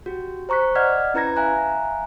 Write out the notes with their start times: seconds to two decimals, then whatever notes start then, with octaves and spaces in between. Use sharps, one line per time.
0.06 F#4 G4
0.49 C5 A#5 C#6 F#6 B6
0.75 D5 D#5 F#5 F6 G#6 B6
1.14 C#4 E4 B4 A#5 G#6 A#6
1.36 E5 F5 G#5 A#5 F#6